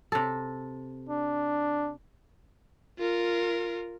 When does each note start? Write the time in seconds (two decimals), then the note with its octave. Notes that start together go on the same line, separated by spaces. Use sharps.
0.12 C3 A4
1.09 D4
2.99 F4 A#4